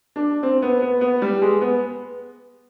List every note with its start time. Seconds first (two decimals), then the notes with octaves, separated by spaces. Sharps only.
0.16 D4
0.43 C4
0.62 B3
0.82 B3
1.01 B3
1.22 G3
1.42 G#3
1.61 B3